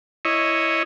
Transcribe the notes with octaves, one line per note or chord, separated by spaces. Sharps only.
E4 C#5 D#5